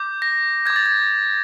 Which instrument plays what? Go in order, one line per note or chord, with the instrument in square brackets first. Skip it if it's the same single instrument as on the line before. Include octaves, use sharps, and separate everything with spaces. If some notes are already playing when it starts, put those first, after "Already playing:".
Already playing: [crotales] D6 G6
A#6
D6 G6 G#6
A6
G#6